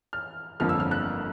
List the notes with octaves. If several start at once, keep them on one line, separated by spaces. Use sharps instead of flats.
F6
G1 F2 D3 F3 A#3 F6
E6
F6
F#6